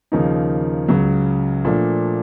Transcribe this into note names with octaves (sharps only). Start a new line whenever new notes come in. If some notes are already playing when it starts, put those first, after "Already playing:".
D#2 C#3 F3 A#3 D#4
C#2 C#3 F#3
A#2 F3 A3 D4